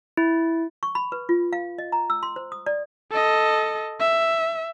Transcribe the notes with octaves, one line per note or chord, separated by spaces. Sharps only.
E4
C#6
B5
B4
F4
F5
D#5
A#5
E6
C6
C5
D#6
D5
A4 D#5
E5